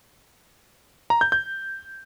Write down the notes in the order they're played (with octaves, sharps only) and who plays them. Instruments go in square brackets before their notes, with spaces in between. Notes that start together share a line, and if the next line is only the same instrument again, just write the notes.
[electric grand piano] A#5
G6
G6